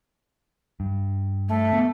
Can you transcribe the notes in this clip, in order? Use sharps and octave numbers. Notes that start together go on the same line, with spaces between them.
G2
A3
B3